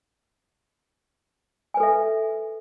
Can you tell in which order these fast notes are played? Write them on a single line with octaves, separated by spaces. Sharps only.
G#5 B4 A4 E5